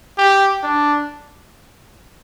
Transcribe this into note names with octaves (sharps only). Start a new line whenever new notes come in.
G4
D4